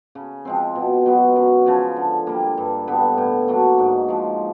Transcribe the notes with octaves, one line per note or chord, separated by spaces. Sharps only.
C#3
F3 G#3 C4
B2
F#3 B3
F#2
C#3 F3
D3
G3 A#3
G2
D3 G3 B3
A2
F#3 A#3 D4
G#2
F3 G#3